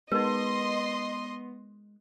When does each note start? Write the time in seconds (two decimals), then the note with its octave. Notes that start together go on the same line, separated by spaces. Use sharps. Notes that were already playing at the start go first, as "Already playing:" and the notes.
0.12 G#3 B3 D#4 A#4 D#5 C6